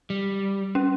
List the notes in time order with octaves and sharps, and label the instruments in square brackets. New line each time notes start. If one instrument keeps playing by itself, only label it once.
[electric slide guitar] G3
[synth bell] C#4